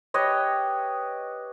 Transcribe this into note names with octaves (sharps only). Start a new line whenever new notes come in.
G4 B4 C#5 D#5